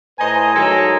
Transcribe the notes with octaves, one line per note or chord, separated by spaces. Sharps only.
A2 B4 C5 D#5 G#5 A#5
D#3 F#3 G#3 A4 G#5 A#5